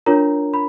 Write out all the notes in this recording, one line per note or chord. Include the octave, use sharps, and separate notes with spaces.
D4 F4 A#4 C#5 A#5
B5